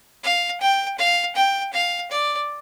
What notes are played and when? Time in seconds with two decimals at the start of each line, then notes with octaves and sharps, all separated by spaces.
0.23 F5
0.61 G5
0.98 F5
1.36 G5
1.73 F5
2.11 D5